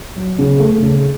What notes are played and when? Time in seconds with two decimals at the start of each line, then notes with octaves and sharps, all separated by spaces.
0.16 F#3
0.39 C#3
0.60 A3
0.82 C#3